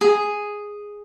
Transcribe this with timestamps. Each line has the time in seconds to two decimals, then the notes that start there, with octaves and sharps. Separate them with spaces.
0.01 G#4